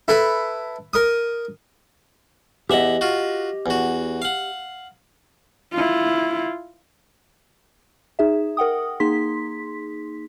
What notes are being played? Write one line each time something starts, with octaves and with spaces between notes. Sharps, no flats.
E4 A4 B4
A#4 D#6
E2 G4 D#5 E5 F#5
F4 F#4
E2 F#4
F5 F#5
E4 F4
D#4 G#4 E5
A#4 F#5 G5 D#6
A#3 D#4 G#4 C6 B6